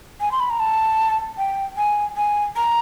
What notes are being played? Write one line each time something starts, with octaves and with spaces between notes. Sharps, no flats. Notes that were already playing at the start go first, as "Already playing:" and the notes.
G#5
C6
B5
A#5
A5
G5
G#5
G#5
A#5